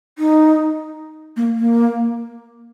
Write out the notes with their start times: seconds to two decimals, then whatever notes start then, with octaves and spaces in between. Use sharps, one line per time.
0.19 D#4
1.37 A#3
1.57 A#3